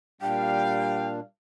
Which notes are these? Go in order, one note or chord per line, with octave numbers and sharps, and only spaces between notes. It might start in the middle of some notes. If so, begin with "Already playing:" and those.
A#2 G3 D4 F5 G5